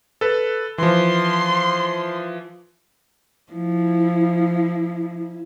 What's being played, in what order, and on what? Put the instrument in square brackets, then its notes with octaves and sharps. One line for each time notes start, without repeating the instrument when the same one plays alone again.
[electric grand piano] A4 B4
[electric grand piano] E3 F3 [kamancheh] C6
[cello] F3 [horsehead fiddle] E4